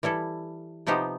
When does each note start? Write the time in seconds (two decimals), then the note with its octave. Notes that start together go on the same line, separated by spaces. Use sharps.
0.03 E3 G3 E4 A4
0.87 C3 F3 B3 D#4 G4 C5